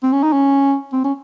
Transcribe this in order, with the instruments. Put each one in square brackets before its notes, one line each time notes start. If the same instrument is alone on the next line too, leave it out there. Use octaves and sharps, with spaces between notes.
[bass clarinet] C4
C#4
D#4
C#4
C4
C#4